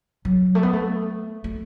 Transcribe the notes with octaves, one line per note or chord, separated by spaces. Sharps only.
F#3
A3
B3
A3
A3